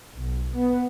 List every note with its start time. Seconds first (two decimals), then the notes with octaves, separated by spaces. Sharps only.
0.13 B1
0.54 B3